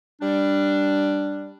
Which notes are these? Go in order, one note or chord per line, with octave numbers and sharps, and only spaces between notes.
G3 D4